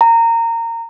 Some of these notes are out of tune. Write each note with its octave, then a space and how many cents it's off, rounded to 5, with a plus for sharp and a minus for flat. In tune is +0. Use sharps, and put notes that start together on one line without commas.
A#5 -20